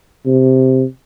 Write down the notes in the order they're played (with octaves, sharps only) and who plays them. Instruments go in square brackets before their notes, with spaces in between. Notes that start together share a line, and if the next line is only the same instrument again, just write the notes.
[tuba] C3